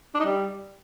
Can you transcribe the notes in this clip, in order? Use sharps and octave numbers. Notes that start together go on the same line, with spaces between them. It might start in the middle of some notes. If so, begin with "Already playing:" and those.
D4
D#4
G3